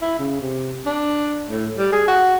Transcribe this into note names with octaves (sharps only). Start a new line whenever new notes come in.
E4
C#3
C3
D4
A2
G3
G#4
F#4